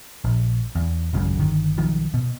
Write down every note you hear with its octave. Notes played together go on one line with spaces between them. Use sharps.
A#1
E2
G#1 C#2 F#2 C#3
G1 D#3
B1 D#3 F3
B2